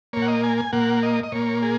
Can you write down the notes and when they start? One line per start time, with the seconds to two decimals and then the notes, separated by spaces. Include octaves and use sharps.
0.13 A#2 A#3 C#5
0.22 F#5
0.28 D#5
0.43 G#5
0.58 G#5
0.72 A#2 A#3 F#5
1.03 D#5
1.23 D#5
1.32 A#2 A#3 C#5
1.63 G#4